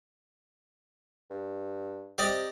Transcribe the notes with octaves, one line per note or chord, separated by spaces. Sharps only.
G2
C3 G4 D5 D#5